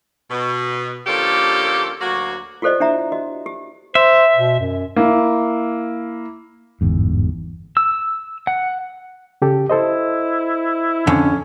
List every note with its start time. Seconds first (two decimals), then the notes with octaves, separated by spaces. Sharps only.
0.30 B2
1.07 D3 F3 A#3 C#4 G4 A4
2.00 D2 F#3 A#3 F#4
2.62 F4 G4 A4 C5 D5 D#5
2.80 D4 E4 G4 E5 A#5
3.12 F#4 D#5
3.46 G4
3.95 C5 E5
4.36 B2
4.60 F#2
4.96 A#3 E4
6.81 G1 E2 G#2
7.77 E6
8.47 F#5
9.42 C#3 G4 A4
9.70 E4 A4 C5 D#5
11.07 F2 D3 C#4